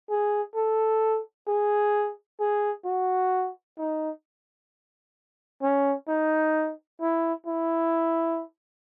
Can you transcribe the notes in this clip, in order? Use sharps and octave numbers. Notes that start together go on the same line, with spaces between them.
G#4
A4
G#4
G#4
F#4
D#4
C#4
D#4
E4
E4